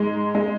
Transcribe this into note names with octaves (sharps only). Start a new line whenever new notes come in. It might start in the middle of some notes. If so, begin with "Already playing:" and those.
Already playing: G#2 G#3
G#3